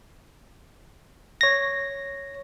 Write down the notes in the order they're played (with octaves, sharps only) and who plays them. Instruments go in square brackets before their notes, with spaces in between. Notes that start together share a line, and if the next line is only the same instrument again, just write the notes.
[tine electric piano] C#5 A#6